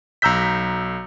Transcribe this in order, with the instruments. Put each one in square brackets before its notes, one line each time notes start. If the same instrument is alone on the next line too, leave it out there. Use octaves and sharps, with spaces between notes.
[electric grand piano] B1 A#5 E6 G6 B6